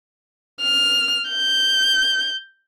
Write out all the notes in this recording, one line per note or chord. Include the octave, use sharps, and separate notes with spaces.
F6
G6